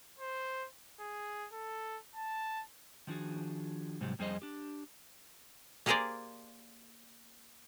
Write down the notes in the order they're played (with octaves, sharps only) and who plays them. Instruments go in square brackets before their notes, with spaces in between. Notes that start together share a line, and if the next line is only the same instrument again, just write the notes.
[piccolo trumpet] C5
G#4
A4
A5
[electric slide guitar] D#3 F3 D4 F#4 G#4
G#2 C3 F#3 G3
F2 G3 G#4 C5 D#5
D4 G4
[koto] A#3 G4 G#4 A#4 C5 D5